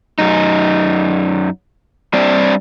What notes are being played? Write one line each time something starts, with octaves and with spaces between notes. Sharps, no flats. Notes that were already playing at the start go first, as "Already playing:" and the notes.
F#2 D#4
G3 C4 D4 C5 D5